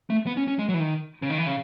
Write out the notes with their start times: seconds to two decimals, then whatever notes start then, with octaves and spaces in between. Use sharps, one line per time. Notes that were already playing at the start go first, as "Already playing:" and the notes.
0.10 A3
0.27 B3
0.37 C#4
0.48 C#4
0.59 G#3
0.69 F#3
0.74 E3
0.80 D#3
1.22 C#3
1.30 D#3
1.38 E3
1.46 C#3